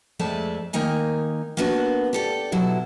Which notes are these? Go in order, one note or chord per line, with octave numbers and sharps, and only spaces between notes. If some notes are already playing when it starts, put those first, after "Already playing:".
F2 G#3 A3 D5 E5 A5
D#3 A#3 D#4 G#5 A#5
A#3 B3 D4 F#4 B4
G4 A4 D5
B2 F#3 E4